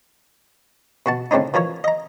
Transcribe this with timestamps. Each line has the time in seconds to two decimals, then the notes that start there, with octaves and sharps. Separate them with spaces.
1.06 B2 F#4 A5
1.31 A2 C#3 C4 D4 D#4
1.54 E3 F3 A#4 C#5
1.84 D#5 A#5